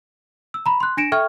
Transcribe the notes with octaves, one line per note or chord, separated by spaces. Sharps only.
E6
A#5 B5
C6 F#6
D4 A#6 C#7 D7 E7
A4 E5 G5 C#6 F6 G#6